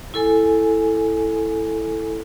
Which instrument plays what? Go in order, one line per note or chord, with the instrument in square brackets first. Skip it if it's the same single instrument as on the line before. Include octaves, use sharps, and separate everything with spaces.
[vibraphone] E4 A4 G#5